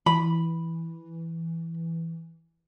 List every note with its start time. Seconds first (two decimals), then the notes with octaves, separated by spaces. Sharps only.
0.06 E3 B5